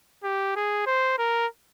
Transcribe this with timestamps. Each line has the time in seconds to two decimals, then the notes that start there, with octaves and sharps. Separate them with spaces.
0.24 G4
0.56 G#4
0.86 C5
1.18 A#4